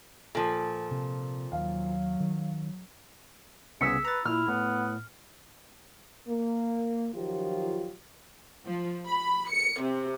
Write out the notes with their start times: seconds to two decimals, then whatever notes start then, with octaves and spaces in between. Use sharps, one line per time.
0.35 A#2 F3 A4
0.91 C3
1.52 D#2 F#3 F5
2.20 D#3
3.81 C2 C#3 B3 G#4 E6 B6 C#7
4.05 B4 A#5 A6
4.25 A#2 E4 F6
4.48 A2 B3
6.28 A#3
7.15 D#3 F3 F#3 F4 G4
8.65 F3
9.06 B5
9.51 C#7
9.82 C3